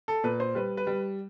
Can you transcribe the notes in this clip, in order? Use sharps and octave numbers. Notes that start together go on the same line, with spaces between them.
A4
A#2 B4
C5
G3 B4
B4
G3